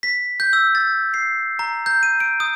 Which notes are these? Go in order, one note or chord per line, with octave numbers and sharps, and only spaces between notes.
B6
G6
E6
A6
C7
A#5
G6
D#7
D7
D#6